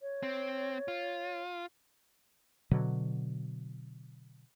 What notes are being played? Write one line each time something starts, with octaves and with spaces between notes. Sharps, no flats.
C#5
C4
F4
B2 D3 F#3